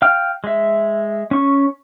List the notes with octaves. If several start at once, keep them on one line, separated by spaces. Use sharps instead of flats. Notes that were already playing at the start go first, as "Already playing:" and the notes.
F5 G5 F6
G#3 E5
C#4 C#6